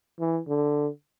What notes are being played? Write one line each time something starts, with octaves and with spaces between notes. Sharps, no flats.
E3
D3